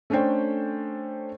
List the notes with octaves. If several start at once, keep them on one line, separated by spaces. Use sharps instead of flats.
A3 C#4 D4 A4 C5 G5